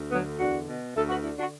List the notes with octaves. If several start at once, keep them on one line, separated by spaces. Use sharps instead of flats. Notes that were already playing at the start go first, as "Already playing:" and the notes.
Already playing: D2
D3 F#3 B3
E2 D4 F#4
B2
D2 E4 A4
F#4 B4
D3 E4 A4
D4 F#4